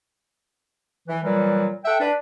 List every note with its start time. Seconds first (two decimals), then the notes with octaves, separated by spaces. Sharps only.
1.09 E3
1.24 A#2 E3 F#3 G3
1.84 A4 E5 F#5 G5
2.01 D4 B4